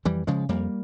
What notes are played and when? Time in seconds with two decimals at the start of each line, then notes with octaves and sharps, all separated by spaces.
0.05 F2 E3 G3
0.27 C#3 F3 G#3
0.49 F2 G3 A#3